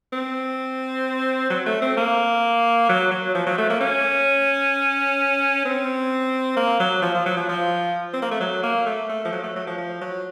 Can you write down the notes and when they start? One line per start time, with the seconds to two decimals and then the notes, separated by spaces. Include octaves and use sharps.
0.13 C4
1.50 F#3
1.66 A3
1.82 C4
1.97 A#3
2.89 F#3
3.11 F#3
3.35 F3
3.47 F#3
3.58 A3
3.70 A#3
3.81 C#4
5.65 C4
6.57 A#3
6.80 F#3
7.02 F3
7.14 F3
7.26 F#3
7.37 F3
7.49 F3
8.14 C4
8.22 A#3
8.31 A3
8.40 F#3
8.63 A#3
8.86 A3
9.09 A3
9.25 F3
9.32 F#3
9.44 A3
9.56 F#3
9.67 F3
9.78 F3
10.02 F#3